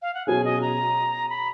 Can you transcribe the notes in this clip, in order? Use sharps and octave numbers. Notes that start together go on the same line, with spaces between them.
F5
F#5
B2 F#3 C#4 G#4 G#5
D#5
A#5
B5